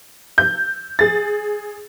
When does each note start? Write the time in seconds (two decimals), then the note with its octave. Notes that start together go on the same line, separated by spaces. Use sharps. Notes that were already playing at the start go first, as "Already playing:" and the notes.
0.38 G6
0.99 G#4 A6